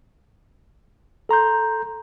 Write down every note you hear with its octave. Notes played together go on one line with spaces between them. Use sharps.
A4 A#5 C6 G6